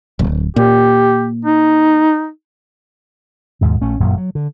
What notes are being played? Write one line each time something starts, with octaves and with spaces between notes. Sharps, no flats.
D1
A#2 G4
D#4
D#2 G#2 B2
A#1 A3 C#4
G1 F#2 A#2 F#3
F#3
D3